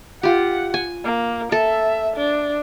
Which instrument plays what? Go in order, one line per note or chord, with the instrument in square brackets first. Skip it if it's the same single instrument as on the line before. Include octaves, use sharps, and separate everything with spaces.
[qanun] F4 G4 [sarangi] F#5
[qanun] G#5
[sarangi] A#3
[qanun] A4 [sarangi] E5
[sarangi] D4